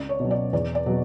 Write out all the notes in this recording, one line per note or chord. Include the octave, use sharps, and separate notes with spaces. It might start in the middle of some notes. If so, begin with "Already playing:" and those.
Already playing: C#2 D5
C#5
B2 F#3
D5
E2 D5
D5
B2 F#3